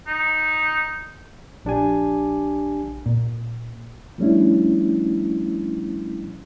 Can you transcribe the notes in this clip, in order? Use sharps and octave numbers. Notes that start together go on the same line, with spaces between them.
D#4
A#1 D4 G4 G#5
A#2
F3 G3 A3 C#4 D4 E4